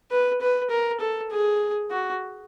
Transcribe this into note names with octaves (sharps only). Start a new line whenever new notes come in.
B4
B4
A#4
A4
G#4
F#4